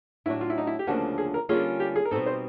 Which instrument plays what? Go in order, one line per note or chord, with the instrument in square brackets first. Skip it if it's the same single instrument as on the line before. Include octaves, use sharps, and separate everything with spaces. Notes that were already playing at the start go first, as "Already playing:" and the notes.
[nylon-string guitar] A2 F#3 A3 D4 F#4 [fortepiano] E4
[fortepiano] F4
E4
D#4
E4
G4
[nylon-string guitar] D2 C#3 F3 A#3 D4 [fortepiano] F#4
[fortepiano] G#4
A#4
[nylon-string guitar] D3 G3 A#3 C#4 F4 [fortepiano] G#4
[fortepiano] G4
G#4
A#4
[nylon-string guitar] B2 G3 C4 D#4 [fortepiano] A4
[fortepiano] C5